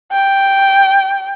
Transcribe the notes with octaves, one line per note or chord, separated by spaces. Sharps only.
G5